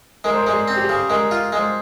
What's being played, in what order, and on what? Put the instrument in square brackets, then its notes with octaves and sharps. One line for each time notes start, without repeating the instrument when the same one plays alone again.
[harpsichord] G#3 [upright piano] A#4
[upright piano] C5
A#4
[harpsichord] G#3
[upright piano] G#4
[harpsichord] C4
[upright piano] G4
G#4
[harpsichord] C#3
[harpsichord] G#3 [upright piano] A#4
[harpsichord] F4
G#3
[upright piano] C5